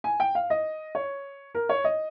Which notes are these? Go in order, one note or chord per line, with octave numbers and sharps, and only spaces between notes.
G#5
G5
F5
D#5
C#5
A#4
C#5
D#5